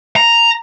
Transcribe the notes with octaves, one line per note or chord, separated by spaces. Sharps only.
A#5